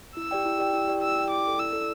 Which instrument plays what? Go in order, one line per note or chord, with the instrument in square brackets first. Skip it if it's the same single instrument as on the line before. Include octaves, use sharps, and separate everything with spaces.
[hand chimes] E4 [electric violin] E6
[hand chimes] G4 D5 G5
E4
G4 D5 G5
E4
G4 D5 G5
[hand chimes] E4 [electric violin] E6
[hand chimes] G4 D5 G5
[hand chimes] E4 [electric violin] D6
[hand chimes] A4 D5
[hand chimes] E4 [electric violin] E6
[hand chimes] A4 D5